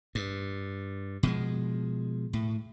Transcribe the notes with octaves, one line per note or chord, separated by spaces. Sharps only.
G2
B2 F3 G#3
A2